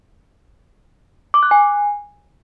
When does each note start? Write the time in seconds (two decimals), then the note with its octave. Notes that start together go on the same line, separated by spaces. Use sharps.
1.34 D6
1.43 F#6
1.51 G#5